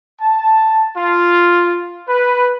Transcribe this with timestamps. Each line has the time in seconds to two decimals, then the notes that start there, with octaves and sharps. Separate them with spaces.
0.20 A5
0.96 F4
2.08 B4